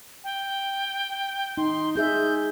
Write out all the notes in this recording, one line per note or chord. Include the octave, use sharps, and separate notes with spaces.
G5
D#4 C6
D#4 G#4 E5 G6